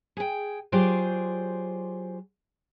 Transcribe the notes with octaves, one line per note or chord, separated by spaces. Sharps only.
G#4 G5
F#3 F4 G4 G#4 C5 D5